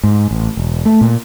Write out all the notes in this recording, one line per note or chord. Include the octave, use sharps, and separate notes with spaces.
G#2
A1
E1
A3
A#2